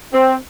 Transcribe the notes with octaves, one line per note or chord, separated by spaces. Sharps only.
C4